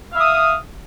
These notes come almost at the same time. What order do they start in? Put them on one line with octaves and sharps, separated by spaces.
F5 E5 D#6